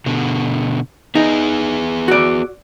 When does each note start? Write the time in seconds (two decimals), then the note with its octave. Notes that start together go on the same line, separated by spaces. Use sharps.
0.06 B2 D3
1.15 B3 D#4 G#4
2.08 F#4 D5